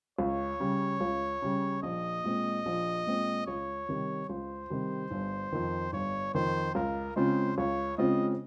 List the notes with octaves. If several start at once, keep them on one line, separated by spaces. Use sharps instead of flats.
C#2 C#5
C#3 G3
C#2
C#3 G3
A#1 D#5
A#2 G#3 C4
A#1
A#2 G#3 C4
C#2 C#5
C3 D#3 G3
C#2 C5
C3 D#3 G3
G1
F2 D#3
G1 C#5
F2 D#3 C5
C#2 A#4
C#3 G#3 C4 F4 C5
C#2 C#5
C#3 G#3 C4 F4 D#5